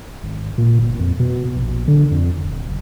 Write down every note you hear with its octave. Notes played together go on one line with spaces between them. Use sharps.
G#1
A#2
G1
F2
B2
A#1
D3
F2
D#1
F#1